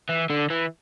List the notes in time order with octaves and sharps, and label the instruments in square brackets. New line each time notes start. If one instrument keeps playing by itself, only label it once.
[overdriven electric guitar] E3
D3
E3